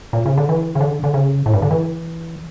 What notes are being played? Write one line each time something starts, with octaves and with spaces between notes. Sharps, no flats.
A#2
C#3
D3
E3
C#3
D3
D3
C#3
A2
G2
D3
E3